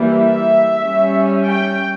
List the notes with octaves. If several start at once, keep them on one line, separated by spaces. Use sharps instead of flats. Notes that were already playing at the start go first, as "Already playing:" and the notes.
Already playing: E3 G3 A#3
E5
G3 C#4
G5